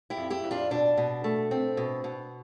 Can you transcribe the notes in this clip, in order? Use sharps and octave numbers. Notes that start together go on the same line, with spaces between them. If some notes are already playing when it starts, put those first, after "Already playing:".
E4 G4
F2
E4 G4
F2
D4 F4
B2 D4
B2
A3
C4
B2
B2